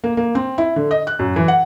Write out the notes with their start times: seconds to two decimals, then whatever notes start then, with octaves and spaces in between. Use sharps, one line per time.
0.04 A#3
0.17 A#3
0.35 C4
0.58 E4
0.76 D3
0.91 D#5
1.07 F#6
1.19 F#2
1.36 E3
1.48 F#5